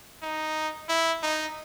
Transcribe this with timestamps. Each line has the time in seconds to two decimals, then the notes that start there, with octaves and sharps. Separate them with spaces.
0.23 D#4
0.89 E4
1.23 D#4